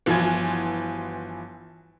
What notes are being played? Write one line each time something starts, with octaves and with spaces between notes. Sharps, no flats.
G1 E3 F3 F#4 G#5 G#6